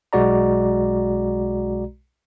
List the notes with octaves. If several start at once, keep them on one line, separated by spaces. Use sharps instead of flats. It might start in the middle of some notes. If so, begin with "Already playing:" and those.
B1 G#3 F#4 D5 A#5